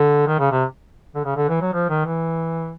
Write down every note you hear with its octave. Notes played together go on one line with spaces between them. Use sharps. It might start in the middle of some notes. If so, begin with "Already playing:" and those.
Already playing: D3
D#3
C#3
C3
D3
C#3
D3
E3
F#3
F3
D#3
E3